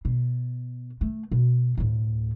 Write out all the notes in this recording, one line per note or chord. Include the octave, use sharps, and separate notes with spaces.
B2
A3
B2
D2 A2